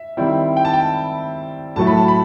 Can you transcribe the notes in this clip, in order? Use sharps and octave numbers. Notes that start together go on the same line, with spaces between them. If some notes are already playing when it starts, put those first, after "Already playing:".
Already playing: E5
D#3 G3 C4 E4
G5
A5
G5
A2 F#3 A3 E4 A5
B5
A5
B5